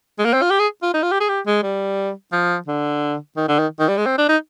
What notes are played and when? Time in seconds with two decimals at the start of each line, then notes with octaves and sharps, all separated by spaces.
0.19 G#3
0.25 A#3
0.34 C4
0.42 F4
0.51 G4
0.59 G#4
0.82 F4
0.94 D#4
1.03 F4
1.12 G4
1.20 G#4
1.29 G4
1.47 G#3
1.63 G3
2.33 F3
2.68 D3
3.37 D#3
3.48 D3
3.59 D#3
3.80 D#3
3.88 G3
3.97 G#3
4.06 C4
4.18 D4
4.29 D#4